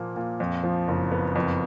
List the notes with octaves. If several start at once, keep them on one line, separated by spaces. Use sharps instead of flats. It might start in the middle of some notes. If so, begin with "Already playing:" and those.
Already playing: A#2 F3 A#3
A#2
F2
F3
F#1
B3
F2